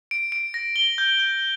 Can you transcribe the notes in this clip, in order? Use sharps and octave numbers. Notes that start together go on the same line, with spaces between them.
D7
D7
A#6
G7
G6
G6